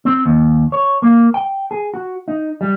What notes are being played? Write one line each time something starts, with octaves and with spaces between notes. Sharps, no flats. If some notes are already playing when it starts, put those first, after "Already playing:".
C4
D#2
C#5
A#3
G5
G#4
F#4
D#4
G3